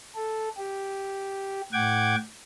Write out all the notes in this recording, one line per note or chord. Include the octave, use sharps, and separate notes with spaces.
A4
G4
A2 F#5 G5 D6 G#6